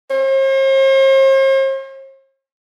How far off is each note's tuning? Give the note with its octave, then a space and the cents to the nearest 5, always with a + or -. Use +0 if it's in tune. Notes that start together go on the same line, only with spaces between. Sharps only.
C5 +45